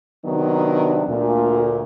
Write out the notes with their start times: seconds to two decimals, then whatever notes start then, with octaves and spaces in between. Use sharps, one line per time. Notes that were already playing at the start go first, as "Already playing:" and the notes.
0.25 C3 D#3 F#3 B3 D4
1.08 D2 A#2